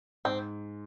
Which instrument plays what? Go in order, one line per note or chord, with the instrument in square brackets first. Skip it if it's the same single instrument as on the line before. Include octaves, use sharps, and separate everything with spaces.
[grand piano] G#2 [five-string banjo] C4